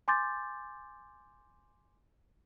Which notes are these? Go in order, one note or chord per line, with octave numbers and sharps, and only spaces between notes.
G#5 C6 D6 G6 A6